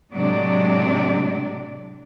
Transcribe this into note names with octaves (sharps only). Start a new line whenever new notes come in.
A2 C3 F#3 G#3 D4 D5